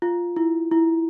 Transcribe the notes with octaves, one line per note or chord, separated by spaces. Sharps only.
F4
E4
E4